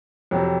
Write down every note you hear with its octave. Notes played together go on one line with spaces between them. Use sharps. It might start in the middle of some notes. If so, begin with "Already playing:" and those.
F2 C3 F#3